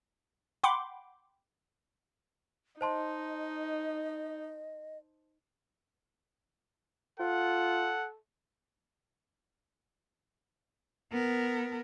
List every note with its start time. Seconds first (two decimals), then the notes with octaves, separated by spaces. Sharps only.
0.64 F#5 G5 B5 C6 D6
2.81 D#4 C5 D#5 A5 C6
7.19 F4 A4 F#5
11.12 B3 A#4